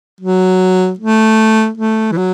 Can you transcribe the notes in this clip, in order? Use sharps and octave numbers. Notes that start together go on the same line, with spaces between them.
F#3
A3
A3
E3
F#3